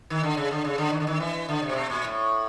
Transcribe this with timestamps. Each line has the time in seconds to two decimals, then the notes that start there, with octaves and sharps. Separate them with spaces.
0.10 D#3
0.23 D3
0.37 C#3
0.51 D3
0.65 C#3
0.78 D3
0.93 D#3
1.00 D3
1.07 D#3
1.20 E3
1.49 D3
1.62 C3
1.69 A#2
1.76 B2
1.90 A#2
2.04 A2